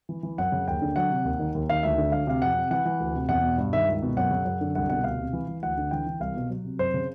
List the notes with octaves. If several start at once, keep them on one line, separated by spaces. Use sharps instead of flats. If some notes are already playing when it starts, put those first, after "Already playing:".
E3
E3
F#2 F#5
C#3
D#2 G5
D3
F#3 F#5
C3
D#2
D#3
D#2
D#3 F5
D2 E5
D3
D2 F5
C3 F5
F2 F#5
C3
E3 F#5
E3
D2
C3
E2 F#5
B2
G2
D#3 E5
C#2
B2
F#2 F#5
C#3
F#2
D3
C2 F#5
B2 F#5
D2 F5
C3
E3
E3
D2 F#5
D3
E3 G5
E3
C2 F5
B2
F#3
C3
F#2 C5
C#3